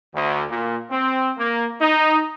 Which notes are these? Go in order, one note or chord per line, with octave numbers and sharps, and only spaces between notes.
D2
A#2
C4
A#3
D#4